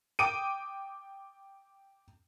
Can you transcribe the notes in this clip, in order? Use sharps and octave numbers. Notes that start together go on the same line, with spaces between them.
G5 D6 D#6 D7 D#7